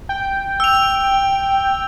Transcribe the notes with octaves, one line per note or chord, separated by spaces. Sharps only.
G5
E6 F7